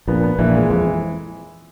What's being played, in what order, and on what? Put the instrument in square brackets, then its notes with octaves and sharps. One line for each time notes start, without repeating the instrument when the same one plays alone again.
[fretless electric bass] A#1 A#2 [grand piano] B3
[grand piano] B3
[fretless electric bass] A#1 A#2 [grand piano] E3
[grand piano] G#3
[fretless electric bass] F2 [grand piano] E3